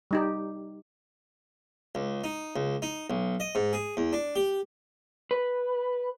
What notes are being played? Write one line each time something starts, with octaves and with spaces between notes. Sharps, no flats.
G3 D#4 G4
C#2
D#4
C#2
D#4
B1
D#5
G#2
G#4
E2
D4
G4
B4